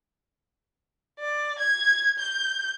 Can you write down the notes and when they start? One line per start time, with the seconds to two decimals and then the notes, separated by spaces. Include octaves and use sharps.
1.19 D5
1.59 G#6
2.18 G6